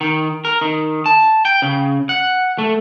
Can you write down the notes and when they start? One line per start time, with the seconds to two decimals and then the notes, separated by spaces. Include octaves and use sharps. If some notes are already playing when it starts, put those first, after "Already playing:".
0.01 D#3
0.45 A#4
0.61 D#3
1.06 A5
1.45 G5
1.62 C#3
2.09 F#5
2.58 A3